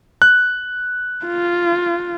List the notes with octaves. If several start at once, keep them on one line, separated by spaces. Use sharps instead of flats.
F#6
F4